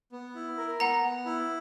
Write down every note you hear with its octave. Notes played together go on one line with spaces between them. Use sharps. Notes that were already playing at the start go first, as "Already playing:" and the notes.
B3
E4
A#4
B3 F#5 A#5
B3
E4